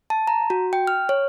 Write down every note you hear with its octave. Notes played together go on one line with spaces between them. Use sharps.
A5
A#5
F#4
G5
F6
C#5